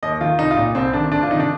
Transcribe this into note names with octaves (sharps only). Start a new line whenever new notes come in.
D#2 D#5
D#3 F4
C2 D#4
F4
A#2 D#4
C2 C4
C3 D#3 D4
D2 D4
F4
C3 D#3 D#4
D4